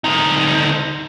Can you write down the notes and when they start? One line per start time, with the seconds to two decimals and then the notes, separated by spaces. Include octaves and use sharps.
0.04 D2 D#4